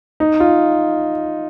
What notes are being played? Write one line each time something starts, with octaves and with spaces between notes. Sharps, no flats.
D#4
F4